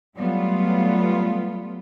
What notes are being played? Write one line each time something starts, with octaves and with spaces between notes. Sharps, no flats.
F#3 G3 A3 B3 F4